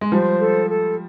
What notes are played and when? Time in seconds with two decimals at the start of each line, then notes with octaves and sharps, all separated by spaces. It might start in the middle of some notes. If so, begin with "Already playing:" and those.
0.01 G#3
0.11 F3 G3 C5
0.40 A4
0.70 A4